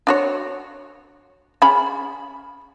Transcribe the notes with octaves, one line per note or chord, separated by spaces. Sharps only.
D4 F#4 C#5
C#4 G#4 B5